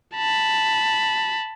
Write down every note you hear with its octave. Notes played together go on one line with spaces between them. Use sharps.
A5 B5